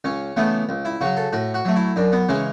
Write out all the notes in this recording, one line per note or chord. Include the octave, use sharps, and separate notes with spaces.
C#2 C#4
C#3 E3 A3 B3
C#2
E4
C#3 F#3 F#4
A4
A2 F#4
F#4
F#3 A3
E4
F#2 D4
B3
C#3 E3 G#3 C#4